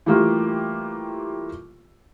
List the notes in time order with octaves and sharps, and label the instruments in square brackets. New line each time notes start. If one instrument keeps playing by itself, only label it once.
[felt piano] E3 G3 A3 A#3 F4 G4